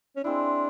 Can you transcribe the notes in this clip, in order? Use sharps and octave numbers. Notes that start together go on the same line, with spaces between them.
C#4
G#3 C4 D4 E4